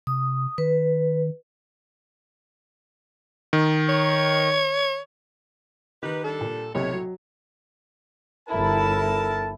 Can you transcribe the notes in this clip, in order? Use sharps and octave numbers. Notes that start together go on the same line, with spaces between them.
C3 D#6
D#3 B4
D#3
C#5
D#3 D#4 G4 B4
G3 D4 A4
A#2
B1 A2 C3 C#5
F#3
G1 E4 A4 A#4 A5